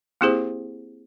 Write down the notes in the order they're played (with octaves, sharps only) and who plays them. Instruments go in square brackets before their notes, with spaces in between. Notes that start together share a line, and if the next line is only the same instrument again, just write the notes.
[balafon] A#3 C4 E4 G4 G#4 C5